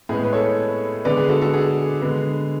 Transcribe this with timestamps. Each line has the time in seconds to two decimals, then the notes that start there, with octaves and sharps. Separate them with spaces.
0.09 A2 G#3 B3 G#4
0.24 B4
0.33 A4 C#5
1.05 D3 G#3 B3 B4 D5
1.17 G#4
1.29 F#4 A4
1.41 F#4 A4
1.54 G#4
2.01 D3 G#3 B3